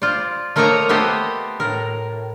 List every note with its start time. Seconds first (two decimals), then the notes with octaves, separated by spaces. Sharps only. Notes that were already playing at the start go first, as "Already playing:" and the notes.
0.02 F4 C5 D5
0.56 A3 A#3 C5 C#5 D#5 A#5
0.89 A3 B3 G4 C5 D#5
1.60 A2 A#4